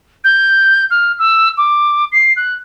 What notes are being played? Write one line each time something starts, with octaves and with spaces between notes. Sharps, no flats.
G6
F6
E6
D6
C7
F#6